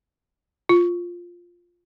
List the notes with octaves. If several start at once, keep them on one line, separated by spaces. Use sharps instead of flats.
F4